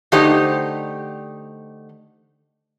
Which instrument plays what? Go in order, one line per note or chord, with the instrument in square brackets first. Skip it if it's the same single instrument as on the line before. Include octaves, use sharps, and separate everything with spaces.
[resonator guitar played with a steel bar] D3 A3 D#4 G4 C5 D#5